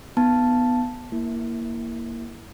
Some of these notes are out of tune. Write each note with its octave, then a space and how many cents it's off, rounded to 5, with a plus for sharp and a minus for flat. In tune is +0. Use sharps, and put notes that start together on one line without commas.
B3 +0 D#4 -10 A5 +0
A#3 +0 E4 +0